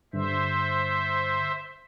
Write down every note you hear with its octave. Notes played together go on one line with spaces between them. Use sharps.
G2 D3 C5 E5